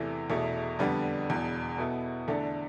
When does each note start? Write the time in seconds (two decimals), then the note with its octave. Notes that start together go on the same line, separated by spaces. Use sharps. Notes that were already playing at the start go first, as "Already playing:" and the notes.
Already playing: E2 C3 E3 A3
0.30 E1 E2 B2 A3 E4
0.79 F2 D3 G3 B3 D4
1.29 E1 E2 B2
1.78 B2 B3 E4 A4
2.28 E2 D3 A3 D4 A4